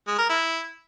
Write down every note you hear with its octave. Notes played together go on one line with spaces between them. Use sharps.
G#3
A#4
E4